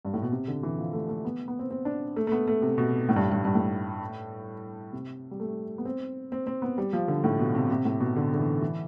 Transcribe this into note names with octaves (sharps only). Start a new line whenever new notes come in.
G2
A2
B2
C3
D3
E3
F3
A3
A3
B3
B3
C4
C4
D4
A3
A3
B3
A3
C3
B2
A2
G2
G2
G2
A2
C3
G3
A3
B3
C4
C4
C4
B3
G3
F3
D3
A2
B2
C3
C3
A2
B2
D3
D3
E3
E3